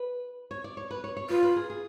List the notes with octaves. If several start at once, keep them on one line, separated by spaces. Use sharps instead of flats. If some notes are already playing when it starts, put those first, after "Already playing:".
Already playing: B4
C#5
D5
C#5
B4
C#5
C#5
F4 B4
B4
G#4
G#4